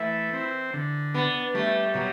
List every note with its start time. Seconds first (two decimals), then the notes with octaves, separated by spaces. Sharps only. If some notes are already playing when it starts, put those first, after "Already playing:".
Already playing: E3 A3 E4
0.33 C4
0.74 D3
1.14 B3 D4
1.54 G3 A3
1.94 B2 F#3